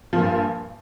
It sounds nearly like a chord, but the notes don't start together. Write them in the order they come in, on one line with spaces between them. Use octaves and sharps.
F3 A#2 G2